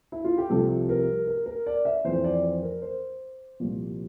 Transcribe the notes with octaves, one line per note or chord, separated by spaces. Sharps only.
E4
F4
G4
C2 C3 F3 A4
A#4
A#4
A#4
D5
E5
F2 E3 C5
D5
C5
A#4
C5
C2 A#2 F3